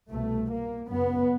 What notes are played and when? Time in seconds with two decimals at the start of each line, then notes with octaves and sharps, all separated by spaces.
0.10 C2 B2 A3
0.50 A#3
0.88 F#2 C#3 B3